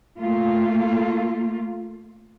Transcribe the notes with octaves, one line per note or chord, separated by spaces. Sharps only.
A3 A#3 F4